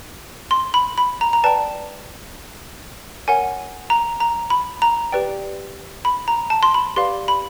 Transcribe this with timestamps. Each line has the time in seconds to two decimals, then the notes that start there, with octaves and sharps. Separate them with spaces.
0.51 C6
0.74 B5
0.98 B5
1.21 A#5
1.33 A#5
1.44 B4 D5 G5 A5
3.28 A#4 C#5 F#5 G#5
3.90 A#5
4.20 A#5
4.50 B5
4.82 A#5
5.12 G4 B4 D5 G5
6.05 B5
6.28 A#5
6.50 A5
6.63 C6
6.74 B5
6.96 G4 B4 D5 F5 C6
7.28 B5